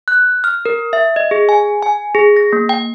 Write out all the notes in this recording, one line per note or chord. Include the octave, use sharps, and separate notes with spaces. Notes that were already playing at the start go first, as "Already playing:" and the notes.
F#6
F6
A#4
E5
D#5
G#4
G#5
G#5
G#4
A#6
A#3
G5